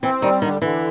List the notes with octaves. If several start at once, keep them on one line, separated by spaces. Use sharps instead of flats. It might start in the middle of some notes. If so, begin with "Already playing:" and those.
E3 C4
D#3 G3
D3 D#3
D3 E3